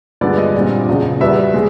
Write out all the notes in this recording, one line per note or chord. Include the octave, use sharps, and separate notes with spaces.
G2 D3 F3 G#3 B3 D5
D#5
A#2 G3 C4
E2 C#3 F3
E2 B2 G3 B3 E5
G#3